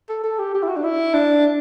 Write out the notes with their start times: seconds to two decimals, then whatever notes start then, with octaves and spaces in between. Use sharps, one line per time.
0.09 A4
0.24 A4
0.39 G4
0.55 G4
0.63 E4
0.69 F#4
0.77 D4
0.84 E4
1.14 D4